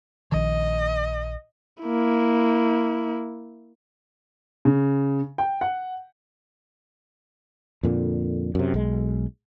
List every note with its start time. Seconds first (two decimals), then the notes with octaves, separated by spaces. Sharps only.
0.32 A#1 D#3 D#5
1.83 A#3 E4
4.65 C#3
5.38 G5
5.61 F#5
7.83 F2 A#2 D3
8.55 F#2 C3
8.74 B1 G#3